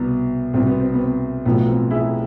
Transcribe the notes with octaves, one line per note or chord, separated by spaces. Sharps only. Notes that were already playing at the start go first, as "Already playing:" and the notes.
Already playing: C2 B2 B3
C2 B2 C4
B3
C4
B3
C4
B1 A2 F3 B3
C4
E4 G#4